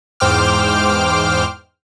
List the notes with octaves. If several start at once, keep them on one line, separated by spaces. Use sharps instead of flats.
E2 G#2 C5 G5 D6 F6